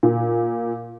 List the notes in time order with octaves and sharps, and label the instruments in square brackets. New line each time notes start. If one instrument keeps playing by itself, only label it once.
[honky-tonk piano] A#2